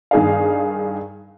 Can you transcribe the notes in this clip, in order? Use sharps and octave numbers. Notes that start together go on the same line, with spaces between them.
G2 D#3 G#4 D5 F5